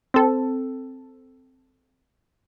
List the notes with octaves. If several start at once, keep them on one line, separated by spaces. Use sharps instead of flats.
C4 A4